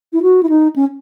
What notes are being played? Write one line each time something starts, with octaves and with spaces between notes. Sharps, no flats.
E4
F#4
E4
D#4
C#4